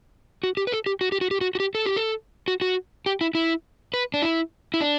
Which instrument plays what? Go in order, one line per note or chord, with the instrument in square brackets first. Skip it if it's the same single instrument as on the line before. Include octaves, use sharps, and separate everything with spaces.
[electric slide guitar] F#4
G4
B4
A4
G4
F#4
G4
F#4
G4
F#4
F#4
G4
A4
G4
A4
F#4
F#4
G4
E4
E4
B4
D4
E4
E4
D4